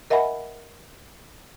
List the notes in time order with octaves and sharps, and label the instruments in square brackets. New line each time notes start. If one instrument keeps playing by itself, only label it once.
[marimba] A#4 D#5 E5 F#5 G#5 B5